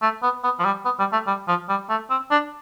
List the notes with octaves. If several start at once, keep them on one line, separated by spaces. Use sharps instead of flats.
A3
B3
B3
F3
G3
B3
G3
A3
G3
F3
G3
A3
C4
D4